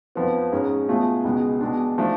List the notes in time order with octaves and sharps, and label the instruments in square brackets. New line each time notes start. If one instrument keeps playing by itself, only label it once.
[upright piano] F2 F3 B3
G#2 G#3 C#4
B2 A3 F4 G#4
C#2 B2 G#3
B2 G#3 D4
F3 A3 D4